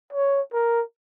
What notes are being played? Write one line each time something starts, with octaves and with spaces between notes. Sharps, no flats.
C#5
A#4